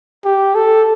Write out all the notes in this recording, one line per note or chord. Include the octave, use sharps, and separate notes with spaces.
G4
A4